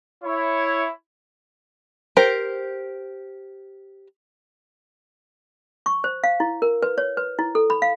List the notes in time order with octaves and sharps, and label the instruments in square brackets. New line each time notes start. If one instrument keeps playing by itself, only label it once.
[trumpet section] E4 C#5
[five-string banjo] G4 A#4 C5
[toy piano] C#6
C5
F5
E4
A#4
B4
C#5
B4
E4
A4
B5
F5